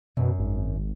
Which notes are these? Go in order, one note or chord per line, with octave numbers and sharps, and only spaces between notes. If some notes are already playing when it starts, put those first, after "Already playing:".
F#2 B2
G#1